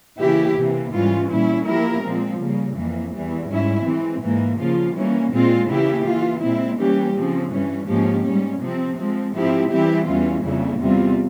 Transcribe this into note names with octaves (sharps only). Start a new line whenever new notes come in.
C#3 E3 A#3 E4 G4
C3 E3 A#3
G#2 E3 G3 C#4 F4
A#2 G3 C#4 E4
F3 A#3 E4 G4 A#4
A#2 F3 G#3 C4
C#3 G3 A#3
F2 E3 A#3
E2 E3 G3
G#2 G3 C#4 E4
E3 G#3 C4
G#2 E3 A#3
C#3 F3 A#3 F4
E3 G3 A#3 C#4
A#2 G#3 C4 F4
C#3 E3 A#3 E4 G4
E3 A#3 F4
A#2 G#3 C4 E4
E3 G3 A#3 C#4 G4
C#3 F3 C4
G2 E3 G3 C#4
G#2 F3 A#3 C#4 G4
G#2 G3 C#4
C3 F3 C4
F3 G#3 C4
G#2 F3 C4 E4 G4
E3 G3 C4 E4 G4
E2 E3 G3 C#4 F4
F2 C#3 G3 A#3 E4
E2 C3 G3 C4 F4